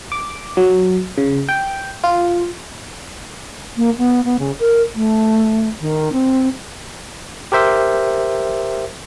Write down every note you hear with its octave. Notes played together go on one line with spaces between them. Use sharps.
D6
F#3
C#3
G5
F4
A#3
B3
B3
C#3
A#4
A3
D#3
C4
G4 A#4 C5 E5